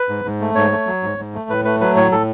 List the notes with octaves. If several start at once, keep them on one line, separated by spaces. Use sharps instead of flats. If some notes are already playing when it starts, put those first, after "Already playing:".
Already playing: B4
G#2
G#2
A3
G#2 C#5
A3
F#3
G#2
G#2
A3
A2 B4
A3 B4
F#3 B4
A2 C#5
A2 A4